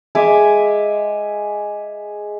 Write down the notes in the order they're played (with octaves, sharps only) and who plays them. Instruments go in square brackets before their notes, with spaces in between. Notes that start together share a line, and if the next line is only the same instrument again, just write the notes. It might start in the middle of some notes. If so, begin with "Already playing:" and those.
[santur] G#3 E5 G#5 D6